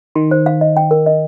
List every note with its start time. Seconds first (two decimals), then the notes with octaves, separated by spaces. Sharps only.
0.15 D#3 C6
0.31 C5
0.46 F5
0.61 D#5
0.77 G5
0.91 A#4
1.06 D#5